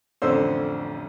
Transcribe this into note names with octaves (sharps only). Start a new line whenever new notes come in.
A1 F2 D3 D4 C5 E6